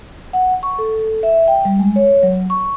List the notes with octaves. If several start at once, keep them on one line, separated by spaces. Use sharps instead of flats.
F#5
C#6
A4
E5
G5
G3
G#3
C#5
F#3
C#6